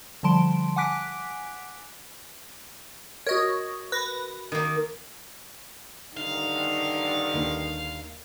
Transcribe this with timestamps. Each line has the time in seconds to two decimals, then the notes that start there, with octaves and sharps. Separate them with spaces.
0.23 D3 F3 G3 A5 C6 D7
0.76 F#5 G#5 D6 F#6 B6 D7
3.27 F#4 A#4 C#5 D#5
3.92 B4 A#6
4.52 D#3 A#3
6.17 G2 D3 D#3 D#4 F5
7.33 D#2 D4